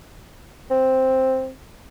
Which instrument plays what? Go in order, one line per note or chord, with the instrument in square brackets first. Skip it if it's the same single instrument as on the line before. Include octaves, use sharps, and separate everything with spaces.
[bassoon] C4